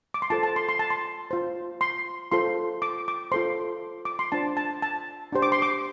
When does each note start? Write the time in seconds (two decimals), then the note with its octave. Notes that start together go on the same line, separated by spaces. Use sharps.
0.14 D6
0.22 C6
0.30 F4 A4 C5 A5
0.43 A5
0.56 C6
0.69 C6
0.79 A5
0.90 C6
1.31 F4 C5
1.81 C6
2.32 F4 A4 C5 C6
2.82 D6
3.08 D6
3.32 F4 A4 C5 C6
4.05 D6
4.19 C6
4.32 D4 F4 C5 A5
4.57 A5
4.82 A5
5.32 D4 G4 C5
5.42 D6
5.52 C6
5.62 D6